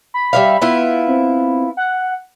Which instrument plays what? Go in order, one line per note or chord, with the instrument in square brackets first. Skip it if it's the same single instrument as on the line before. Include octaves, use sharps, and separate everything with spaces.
[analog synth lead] B5
[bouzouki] G3 E5 F5
B3 E4 F4
[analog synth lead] C4
F#5